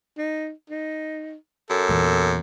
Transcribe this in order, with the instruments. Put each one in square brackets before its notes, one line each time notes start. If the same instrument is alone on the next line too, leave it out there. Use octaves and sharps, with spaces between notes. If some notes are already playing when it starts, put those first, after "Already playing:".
[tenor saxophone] D#4
D#4
[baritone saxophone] F#2 [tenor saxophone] A4
[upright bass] E2 A#2